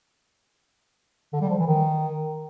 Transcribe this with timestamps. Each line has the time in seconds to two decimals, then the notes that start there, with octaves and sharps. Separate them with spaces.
1.32 D3
1.41 G3
1.50 F3
1.58 E3
1.67 D#3